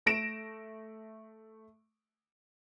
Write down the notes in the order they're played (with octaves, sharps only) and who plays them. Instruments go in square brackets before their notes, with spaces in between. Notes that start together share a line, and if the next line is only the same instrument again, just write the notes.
[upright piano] A3 A#6 D7 E7